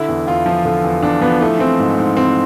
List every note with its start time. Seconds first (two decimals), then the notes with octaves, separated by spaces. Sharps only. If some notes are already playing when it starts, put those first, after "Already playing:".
Already playing: D3 E4
0.08 E2
0.27 E2 F4
0.46 F3
0.65 D3
0.84 E2
1.03 E2 D4
1.21 F3 B3
1.41 E3 A3
1.59 E3 C4
1.79 G#2
1.98 G#2
2.16 E3 C4